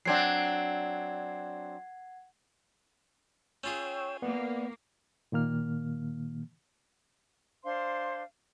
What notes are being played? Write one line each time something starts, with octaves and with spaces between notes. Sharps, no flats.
F#3 C4 D4 F#5 G#6 C7
C#4 F4 G#4 C#5 G5 E6
A#3 B3 D5
A#2 D#3 A#3 F6
D4 C5 F5 C6